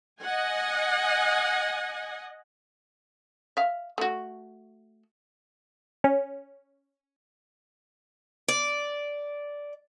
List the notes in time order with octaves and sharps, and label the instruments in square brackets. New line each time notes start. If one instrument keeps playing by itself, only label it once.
[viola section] D#5 F#5 G#5
[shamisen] E5 F5
A3 F#4
[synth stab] C#4
[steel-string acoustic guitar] D5